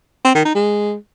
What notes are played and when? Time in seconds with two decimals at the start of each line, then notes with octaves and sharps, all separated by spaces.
0.25 C4
0.35 D#3
0.45 D#4
0.55 G#3